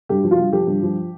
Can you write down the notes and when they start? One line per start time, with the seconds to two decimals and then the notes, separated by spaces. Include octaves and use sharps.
0.09 G2 G4
0.24 F3
0.31 F4
0.39 G2
0.53 F3 G4
0.67 G2
0.83 F3